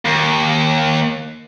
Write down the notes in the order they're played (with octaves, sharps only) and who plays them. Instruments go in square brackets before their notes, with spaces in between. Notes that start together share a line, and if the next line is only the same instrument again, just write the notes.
[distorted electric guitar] D#2